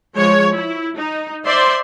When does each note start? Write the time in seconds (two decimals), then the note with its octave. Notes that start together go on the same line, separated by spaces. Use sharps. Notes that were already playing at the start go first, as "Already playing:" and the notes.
0.16 F3 G#3 C#5
0.53 E4
0.97 D#4
1.45 C5 D5 E5 C6